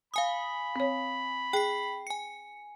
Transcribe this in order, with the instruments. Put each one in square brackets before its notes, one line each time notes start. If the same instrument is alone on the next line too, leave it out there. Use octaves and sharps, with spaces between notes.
[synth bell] F5 G#5 D#6 [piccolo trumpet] B5
[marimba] C4 C#5
[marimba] G#4 [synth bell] G5 C7
[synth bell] G#5 C#7